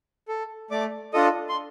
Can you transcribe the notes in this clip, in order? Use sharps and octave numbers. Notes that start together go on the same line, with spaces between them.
A4
A3 D5 D6
D4 F4 A4 D#5 D#6
C6